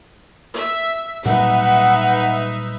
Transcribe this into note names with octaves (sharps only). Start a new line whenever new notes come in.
E5
A#2 F#3 G3 D#4 B4 E5 F#5